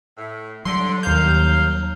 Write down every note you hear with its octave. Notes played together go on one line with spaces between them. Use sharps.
A2
D3 F#3 G3 C6
D#2 A#3 F5 G6